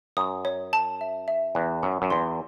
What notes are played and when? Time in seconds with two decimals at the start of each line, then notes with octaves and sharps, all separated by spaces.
0.17 F#2 D#6
0.45 C#5
0.73 A5
1.01 E5
1.28 E5
1.55 E2 F#6
1.83 F#2 F#5
2.02 F#2
2.10 E2 C6